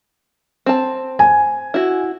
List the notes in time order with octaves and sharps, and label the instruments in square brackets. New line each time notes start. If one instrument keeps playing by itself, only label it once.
[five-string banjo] C4 A5
[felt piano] G#5
[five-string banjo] E4 F#4